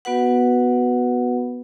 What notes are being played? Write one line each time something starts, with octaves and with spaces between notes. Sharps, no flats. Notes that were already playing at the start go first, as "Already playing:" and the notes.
B3 F#4 B4 F#5